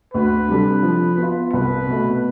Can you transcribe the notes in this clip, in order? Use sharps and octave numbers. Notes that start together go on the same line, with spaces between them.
D2 B4
C3 G3 D4 A4
F3
B3 F4
C2 B4
B2 A3